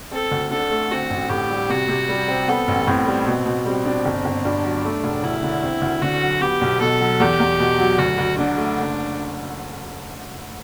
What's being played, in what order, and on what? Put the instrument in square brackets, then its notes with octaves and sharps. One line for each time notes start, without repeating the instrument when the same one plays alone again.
[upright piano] C4 [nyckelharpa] A4
[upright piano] D2
[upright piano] D3 [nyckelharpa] A4
[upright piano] A3
[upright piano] C4 [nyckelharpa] F#4
[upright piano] A1
[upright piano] A2 [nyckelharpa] G4
[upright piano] G3
[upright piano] C3 [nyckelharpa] F#4
[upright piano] C3
G3
C4
[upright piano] B3 [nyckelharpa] A4
[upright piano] A1
[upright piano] A2 [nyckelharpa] C4
[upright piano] G3
B2
B2
[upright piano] G3 [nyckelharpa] C4
[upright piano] D4
G1
G1
[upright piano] G2 [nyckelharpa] D4
[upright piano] F#3
A3
E1
[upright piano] D2 [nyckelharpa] E4
[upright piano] D3
C4
D2
[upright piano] D3 [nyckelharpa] F#4
[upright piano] F#3
[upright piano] B3 [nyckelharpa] G4
[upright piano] B1
[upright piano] B2 [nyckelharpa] A4
[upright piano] F#3
[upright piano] E2 [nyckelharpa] G4
[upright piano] E2
B2
F#3
[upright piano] D2 [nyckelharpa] F#4
[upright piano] D2
[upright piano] D3 [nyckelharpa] D4
[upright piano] A3
F#1